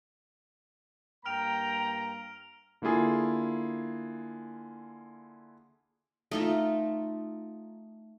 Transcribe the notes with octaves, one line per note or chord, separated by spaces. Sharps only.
G2 A#3 G5 A#5 F6 D7 F7
D3 A#3 E4 F4 G#4
A3 D#4 F4